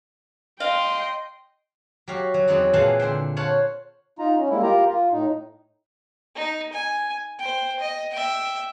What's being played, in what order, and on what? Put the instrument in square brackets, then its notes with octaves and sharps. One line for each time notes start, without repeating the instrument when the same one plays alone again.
[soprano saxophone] D#5 [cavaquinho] F5 [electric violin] G5 C6
[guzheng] F#3 F#4 G4 F5
F#3
E2 F#3 C4 D#4 C#5 D5
A#2 E3 G#3 F5 F#5 A5
D3 C5 E5 G5
C5 C#5 F5 F#5 A5
[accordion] D#4 F4 A#5
C#4
G3 G#3 A#3 E4
F4 G4 A#4 A#5
F4
A2 D#4
[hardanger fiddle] D#4
G#5
C5 G5
D#5
E5 G5